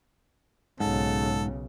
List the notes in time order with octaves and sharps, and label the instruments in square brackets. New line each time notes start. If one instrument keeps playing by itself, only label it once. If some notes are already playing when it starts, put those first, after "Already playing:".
[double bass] B1 C#3 [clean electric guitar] G#2 [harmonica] A4